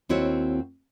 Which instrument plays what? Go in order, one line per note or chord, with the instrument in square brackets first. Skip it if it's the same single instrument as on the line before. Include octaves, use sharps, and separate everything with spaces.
[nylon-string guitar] D#2 C4 E4 F#4 C#5